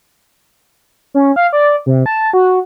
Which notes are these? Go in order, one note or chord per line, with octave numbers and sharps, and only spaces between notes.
C#4
F5
D5
C3
A5
F#4